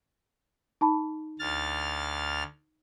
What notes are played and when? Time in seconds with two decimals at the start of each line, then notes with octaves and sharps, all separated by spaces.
0.81 D#4 A5 B5
1.39 D2 F6 A6